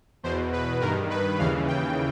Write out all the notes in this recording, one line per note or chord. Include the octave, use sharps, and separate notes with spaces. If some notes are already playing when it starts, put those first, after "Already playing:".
E2 B2 C5
B4
G2 D#3 A#4
B4
D#2 C#3 E3 F5
G5